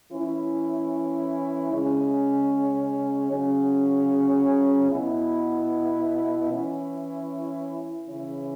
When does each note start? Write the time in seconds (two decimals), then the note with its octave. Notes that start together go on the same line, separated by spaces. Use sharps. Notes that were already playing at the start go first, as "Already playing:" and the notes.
0.12 E3 C#4 E4
1.71 C#3 G#3 C#4
3.31 C#3 F#3 C#4
4.90 B2 B3 E4
6.49 E3 C#4 E4
8.09 C#3 E3 C#4 E4